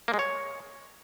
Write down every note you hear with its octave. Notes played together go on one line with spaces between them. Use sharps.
A#3
G#3
C#5